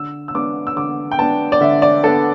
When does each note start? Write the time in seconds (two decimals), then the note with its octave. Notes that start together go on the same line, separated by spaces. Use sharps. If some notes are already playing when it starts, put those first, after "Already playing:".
Already playing: D3 E6
0.28 E6
0.35 B3 D4 D6
0.67 E6
0.76 D3 D6
1.12 G5
1.18 B3 D4 A5
1.52 D5
1.61 D3 E5
1.82 D5
2.04 B3 D4 A4